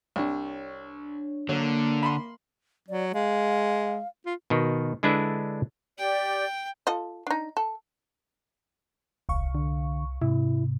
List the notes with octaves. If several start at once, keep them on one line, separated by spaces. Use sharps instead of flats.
C2 D4 C#5
D3 F#3 A#3
B5 C6
F#3 D5
G#3 F5
F4
B2 D#3
D3 G#3 D4 E4 B4 E5
G4 D5 G5
F4 A4 D#5
D4 D#4
A4
D#1 C2 F5 C#6
D3
G#2 C3 E4